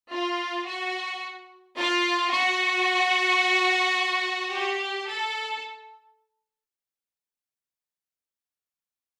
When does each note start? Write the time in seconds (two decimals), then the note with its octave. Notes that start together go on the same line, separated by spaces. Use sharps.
0.11 F4
0.66 F#4
1.76 F4
2.32 F#4
4.52 G4
5.08 A4